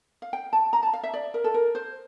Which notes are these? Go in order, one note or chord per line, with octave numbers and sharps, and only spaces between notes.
F5
G5
A5
A#5
A5
F5
E5
D5
A#4
A4
A#4
C5